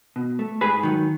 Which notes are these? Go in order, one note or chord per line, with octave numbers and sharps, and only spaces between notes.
B2
A3
G#2 G#4 B4
D#3 F#3